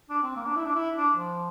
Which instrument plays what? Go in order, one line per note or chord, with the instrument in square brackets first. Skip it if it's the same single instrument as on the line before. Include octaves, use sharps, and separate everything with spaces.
[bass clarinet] D4
C4
A#3
D4
E4
D4
E4
D4
F3